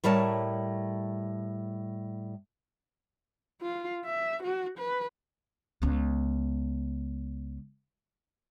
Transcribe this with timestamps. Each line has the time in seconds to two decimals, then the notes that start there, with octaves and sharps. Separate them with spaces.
0.04 A2 G3 A#4 C#5 A5
3.62 F4
4.05 E5
4.43 F#4
4.78 B4
5.82 C#2 B3